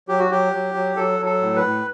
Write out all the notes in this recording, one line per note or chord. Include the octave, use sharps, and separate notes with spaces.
F#3 G4
F#4
F#3 G4
F#3
F#3
F#3 A4
F#3
A4
A2
B4
A2